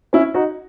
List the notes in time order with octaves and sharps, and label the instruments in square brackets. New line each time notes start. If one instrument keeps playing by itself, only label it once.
[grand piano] C#4 E4
D#4 F#4